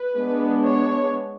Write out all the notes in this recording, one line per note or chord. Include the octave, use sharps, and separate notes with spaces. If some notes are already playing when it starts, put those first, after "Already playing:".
Already playing: B4
G#3 B3 D4
C#5